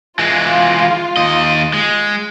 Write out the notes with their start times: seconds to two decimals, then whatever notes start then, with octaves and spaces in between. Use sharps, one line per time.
0.19 E3 G#3 F4
1.17 D#2 D#5
1.74 G#3